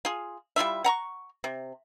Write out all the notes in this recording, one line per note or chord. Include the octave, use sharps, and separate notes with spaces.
F4 G#4
G3 E4 F4 E5
F#5 A#5 C#6
C3